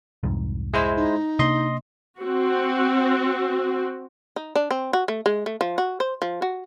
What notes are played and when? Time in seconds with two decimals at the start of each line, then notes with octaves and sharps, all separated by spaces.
0.23 C2 F2 G#2
0.74 G#3 E4 C5 E5
0.96 D#4
1.39 C3 A#3 D4 D#5 C6
2.20 C4 F#4
4.36 D#4
4.56 D4
4.71 C4
4.93 F#4
5.08 A3
5.26 G#3
5.46 A3
5.61 F3
5.78 F#4
6.00 C5
6.22 F3
6.42 F#4